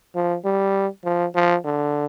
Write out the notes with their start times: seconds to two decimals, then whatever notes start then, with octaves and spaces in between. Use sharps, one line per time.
0.15 F3
0.45 G3
1.05 F3
1.35 F3
1.64 D3